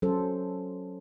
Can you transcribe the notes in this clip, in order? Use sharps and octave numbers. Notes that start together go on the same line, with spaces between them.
F#3 C#4 A4 C5